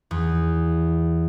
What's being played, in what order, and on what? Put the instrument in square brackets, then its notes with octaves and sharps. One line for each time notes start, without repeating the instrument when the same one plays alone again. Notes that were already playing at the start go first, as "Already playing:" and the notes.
[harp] E2